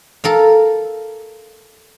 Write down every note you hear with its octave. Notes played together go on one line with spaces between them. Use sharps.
A4 A#4 F5